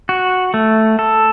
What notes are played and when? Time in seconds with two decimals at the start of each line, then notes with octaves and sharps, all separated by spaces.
0.09 F#4
0.54 A3
0.99 A4